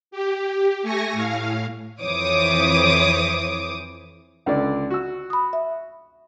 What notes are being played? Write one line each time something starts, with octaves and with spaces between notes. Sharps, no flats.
G4
A3 G#5 C#6 A#6
A2 F5
F2 E3 C5 C#5 D6 D#6
C#2 D3 D5
F#4 E6
B5 D#6
E5